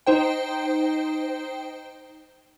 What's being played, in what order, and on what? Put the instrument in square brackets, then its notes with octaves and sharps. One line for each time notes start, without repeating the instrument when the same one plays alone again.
[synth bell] D#4 C5 G5